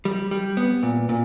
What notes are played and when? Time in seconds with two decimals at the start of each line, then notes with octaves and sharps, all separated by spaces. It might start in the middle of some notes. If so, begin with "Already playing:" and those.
0.05 G3
0.31 G3
0.57 B3
0.83 A#2
1.09 A#2